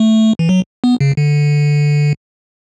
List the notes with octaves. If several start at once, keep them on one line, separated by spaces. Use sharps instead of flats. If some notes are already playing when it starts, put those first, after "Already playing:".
Already playing: A3
E3
F#3
B3
C#3
D3